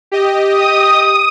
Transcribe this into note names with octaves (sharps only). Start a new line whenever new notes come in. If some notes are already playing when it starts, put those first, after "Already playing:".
G4 D#5
D#6